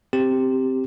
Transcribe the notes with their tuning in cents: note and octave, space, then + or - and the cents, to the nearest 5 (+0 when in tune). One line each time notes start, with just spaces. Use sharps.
C4 +0 G4 +0